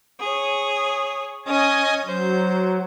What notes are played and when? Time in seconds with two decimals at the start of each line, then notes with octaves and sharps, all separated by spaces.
0.20 G#4 C#5
1.46 C#4 D#5 G#5 D#6
2.05 F#3 C5